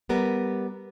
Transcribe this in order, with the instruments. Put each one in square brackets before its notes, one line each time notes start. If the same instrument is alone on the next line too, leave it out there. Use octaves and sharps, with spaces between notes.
[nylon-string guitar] G3 B3 A#4